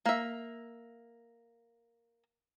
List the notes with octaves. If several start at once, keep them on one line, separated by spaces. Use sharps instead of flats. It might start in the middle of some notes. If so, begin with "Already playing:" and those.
A#3 E5